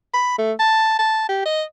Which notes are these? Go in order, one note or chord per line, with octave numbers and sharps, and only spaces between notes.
B5
A3
A5
A5
G4
D#5